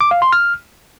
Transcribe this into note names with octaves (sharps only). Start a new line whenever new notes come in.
D6
F5
C6
F6